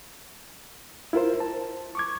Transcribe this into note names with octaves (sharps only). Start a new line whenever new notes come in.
E4 F4 A#4 C5
A5
C#6 D6 G#6